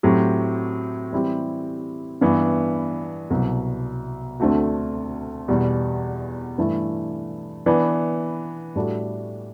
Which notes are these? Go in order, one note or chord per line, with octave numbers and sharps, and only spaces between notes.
A2 F#3 C4 G4
E3 G3 C4 E4 G4
G2 E3 B3
C2 B2 F#3 B3
D2 D3 A3 C4 F#4
E2 B2 G3
G2 E3 A3 E4 A4
E3 B3 D4
A2 G3 D4 F#4 A4